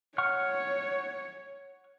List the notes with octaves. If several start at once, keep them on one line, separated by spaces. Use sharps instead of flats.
C#5 F#5 C#6 F6